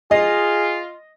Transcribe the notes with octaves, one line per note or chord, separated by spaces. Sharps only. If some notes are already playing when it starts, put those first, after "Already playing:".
F4 G#4 D#5